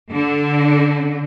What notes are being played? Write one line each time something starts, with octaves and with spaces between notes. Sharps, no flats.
D3